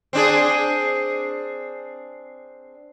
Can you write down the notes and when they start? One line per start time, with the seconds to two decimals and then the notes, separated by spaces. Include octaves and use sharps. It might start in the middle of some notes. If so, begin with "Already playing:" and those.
0.13 C4 D4 G#4